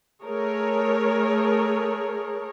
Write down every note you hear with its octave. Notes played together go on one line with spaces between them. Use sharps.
A3 G#4 A#4 C#5